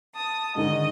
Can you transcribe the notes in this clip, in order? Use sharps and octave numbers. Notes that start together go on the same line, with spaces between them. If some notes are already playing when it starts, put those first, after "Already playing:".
A5 D#6
G#2 D3 D#3 D#5